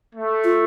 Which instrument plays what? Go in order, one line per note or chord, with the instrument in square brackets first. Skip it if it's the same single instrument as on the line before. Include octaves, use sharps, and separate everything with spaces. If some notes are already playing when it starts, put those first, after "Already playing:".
[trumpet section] A3
[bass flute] F4